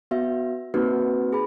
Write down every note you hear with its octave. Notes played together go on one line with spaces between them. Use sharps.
B3 F#4 E5
A#3 C4 D#4 F#4 B4
G#4 B5